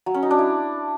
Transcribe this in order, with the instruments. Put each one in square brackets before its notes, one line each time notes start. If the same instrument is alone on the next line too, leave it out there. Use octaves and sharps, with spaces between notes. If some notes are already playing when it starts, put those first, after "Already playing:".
[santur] F#3
C#4
D#4
D4
E4